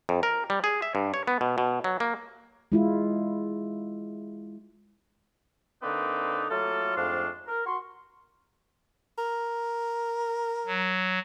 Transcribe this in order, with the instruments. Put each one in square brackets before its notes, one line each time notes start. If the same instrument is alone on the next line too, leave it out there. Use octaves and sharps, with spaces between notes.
[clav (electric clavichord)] F2
A#4
G3
G#4
E5
G2
C#5
B3
B2
B2
F#3
A#3
[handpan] G#3 E4 F4
[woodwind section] D3 A#3 C4 D#4 B4 D5
F#3 A3 A#3 F4 A4
F2 G#2 A3 D4 F5 C6
A#4
F#4 C6 C#6
[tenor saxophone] A#4
[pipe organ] F#3